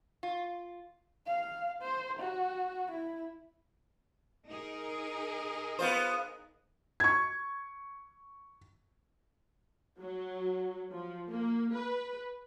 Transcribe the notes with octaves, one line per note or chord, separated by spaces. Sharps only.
F4
F5
C5
F#4
E4
D#4 G#4 A#4
B3 F4 C5
C#6 G#6
F#3
F3
A#3
B4